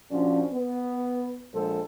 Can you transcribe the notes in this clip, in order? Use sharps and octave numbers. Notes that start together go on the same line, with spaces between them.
A#1 F3 C#4 D4 F#4
B3
A#1 A#2 G#3 A4 C5